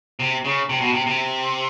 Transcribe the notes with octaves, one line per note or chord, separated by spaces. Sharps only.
C3
C#3
C3
B2
C3
C3